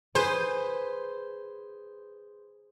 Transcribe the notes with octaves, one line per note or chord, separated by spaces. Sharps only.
G#4 B4 C5